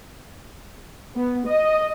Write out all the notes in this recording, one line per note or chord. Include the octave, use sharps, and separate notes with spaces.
B3
D#5